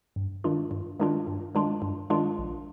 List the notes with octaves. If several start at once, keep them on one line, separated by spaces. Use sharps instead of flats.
G2
D#3 G#3 D4 F4
G2
D#3 G#3 D4 F4
G2
D#3 G#3 D4 F4
G2
D#3 G#3 D4 F4
A#1